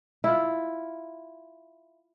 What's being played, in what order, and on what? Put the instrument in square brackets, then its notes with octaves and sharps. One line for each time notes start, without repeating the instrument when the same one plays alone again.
[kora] E4 F4